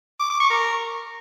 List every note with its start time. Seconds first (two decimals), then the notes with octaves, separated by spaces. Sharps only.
0.20 D6
0.30 D6
0.40 C#6
0.50 A#4